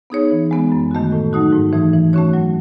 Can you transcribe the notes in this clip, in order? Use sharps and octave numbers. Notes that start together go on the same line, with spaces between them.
B3 D#4 G#4 C#5
E3
G#3 B3
F#2
D#3 A3 C#4 F#4
A2
F#3 A3 D#4 F#4
G#2
E3 A3 D#4
E3
A3 C#4 F#4 C#5
F#3